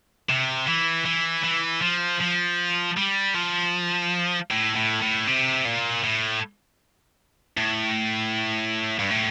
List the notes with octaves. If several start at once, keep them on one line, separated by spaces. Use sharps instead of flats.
C3
E3
E3
E3
F3
F3
G3
F3
A2
A2
A2
C3
A#2
A2
A2
G2
A2